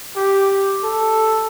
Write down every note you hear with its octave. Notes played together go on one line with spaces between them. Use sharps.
G4
A4